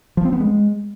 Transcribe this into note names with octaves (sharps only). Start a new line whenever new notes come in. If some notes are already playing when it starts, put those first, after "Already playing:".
F3
C4
B3
G#3